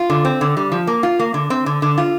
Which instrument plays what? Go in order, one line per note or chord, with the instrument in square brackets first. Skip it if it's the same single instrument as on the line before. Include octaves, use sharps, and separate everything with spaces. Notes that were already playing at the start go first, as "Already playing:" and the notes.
Already playing: [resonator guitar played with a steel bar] F4
D3
C4
D3
G3
F3
A#3
F4
A#3
D3
C4
D3
D3
F4